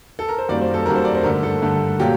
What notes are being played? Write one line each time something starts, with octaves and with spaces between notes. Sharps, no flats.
A4
A#4
C5
F#2 D#3 G3 A#3 D5
C5
A4
F#2 D#3 G3 A#3 A#4
C5
D5
C5
G2 D3 A3 A#4
A4
G2 D3 A3
A#2 F#3 A#3 G4